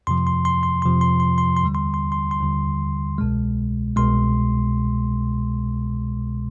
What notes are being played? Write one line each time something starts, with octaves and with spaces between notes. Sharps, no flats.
F2 C3 F3 C6
C6
C6
C6
F2 C3 F3 C6
C6
C6
C6
C6
D#2 D3 G3
C6
C6
C6
C6
D#2 D3 G3
C2 B2 G#3
C2 B2 G#3 C6